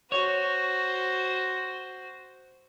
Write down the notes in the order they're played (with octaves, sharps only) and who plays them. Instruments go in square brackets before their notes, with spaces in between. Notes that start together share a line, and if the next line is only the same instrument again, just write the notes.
[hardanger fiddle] F#4 C5 [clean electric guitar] C#5